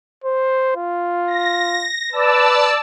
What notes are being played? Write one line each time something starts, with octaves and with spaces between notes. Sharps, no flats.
C5
F4
A#6
B4 D5 A5 E6